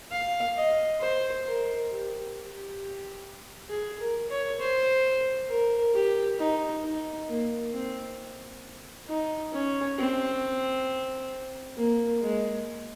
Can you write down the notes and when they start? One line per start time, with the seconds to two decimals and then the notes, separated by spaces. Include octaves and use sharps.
0.12 F5
0.56 D#5
1.01 C5
1.46 A#4
1.91 G4
2.36 G4
3.70 G#4
4.00 A#4
4.30 C#5
4.60 C5
5.50 A#4
5.94 G4
6.39 D#4
6.84 D#4
7.29 A#3
7.73 C4
9.08 D#4
9.53 C#4
9.98 C4
11.77 A#3
12.21 G#3